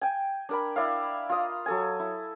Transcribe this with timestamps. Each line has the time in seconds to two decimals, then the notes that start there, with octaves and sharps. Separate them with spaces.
0.01 G5 G#5
0.49 D4 A#4 B5
0.76 E4 D5 E5 F5
1.29 F4 D#5
1.66 F#3 A4 G#5
1.99 E4